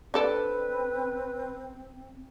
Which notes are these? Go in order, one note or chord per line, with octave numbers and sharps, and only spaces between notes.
C4 D4 A4 B4 D5